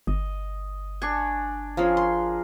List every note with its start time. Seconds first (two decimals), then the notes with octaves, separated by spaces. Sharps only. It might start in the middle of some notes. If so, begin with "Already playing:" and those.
0.07 G1 D#5
1.02 D4 G#5 C#6
1.77 F3 C#4 G#4 A#4
1.97 C6